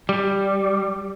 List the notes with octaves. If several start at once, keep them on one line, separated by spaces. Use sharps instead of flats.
G3